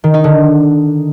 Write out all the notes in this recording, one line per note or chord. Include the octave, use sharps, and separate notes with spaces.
D#3
D#4
D3